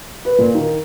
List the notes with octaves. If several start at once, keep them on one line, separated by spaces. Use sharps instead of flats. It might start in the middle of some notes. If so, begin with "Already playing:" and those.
B4
A#2
D#3